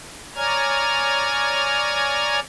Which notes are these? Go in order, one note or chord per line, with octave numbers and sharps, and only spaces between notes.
C#5 D5 G#5 A#5 F6 G#6